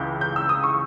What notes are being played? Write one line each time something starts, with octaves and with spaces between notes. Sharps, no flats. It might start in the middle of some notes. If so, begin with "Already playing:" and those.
Already playing: C#2 C#3 E3 G6
G6
E6
D#6
C#6